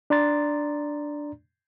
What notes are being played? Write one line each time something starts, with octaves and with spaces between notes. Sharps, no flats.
D4 D5 A#5 C6 A6